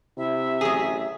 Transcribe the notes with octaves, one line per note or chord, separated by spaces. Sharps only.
C3 E4 E5
A1 F#3 G#4